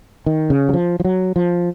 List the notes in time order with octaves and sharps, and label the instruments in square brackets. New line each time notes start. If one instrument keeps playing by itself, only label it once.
[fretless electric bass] D#3
C#3
F#3
F3
F3
F#3
F3